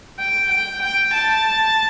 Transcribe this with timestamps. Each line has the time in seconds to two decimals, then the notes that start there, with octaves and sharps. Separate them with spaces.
0.20 G5
0.51 G5
0.82 G5
1.13 A5